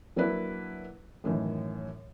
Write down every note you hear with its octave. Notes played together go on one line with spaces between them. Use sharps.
F#3 A#3 D4 E4 B4
F#2 A2 D#3 E3